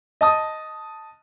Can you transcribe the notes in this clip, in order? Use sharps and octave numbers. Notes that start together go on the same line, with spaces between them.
D#5 A5 D#6